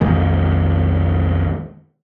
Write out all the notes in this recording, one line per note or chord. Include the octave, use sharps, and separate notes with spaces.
B1 F2 D#3 G#3